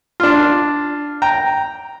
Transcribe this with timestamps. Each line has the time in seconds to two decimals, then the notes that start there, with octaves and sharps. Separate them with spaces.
0.20 D4 F4
1.22 G5 A#5